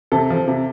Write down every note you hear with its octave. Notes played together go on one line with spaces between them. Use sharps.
C3 A4
F3
C3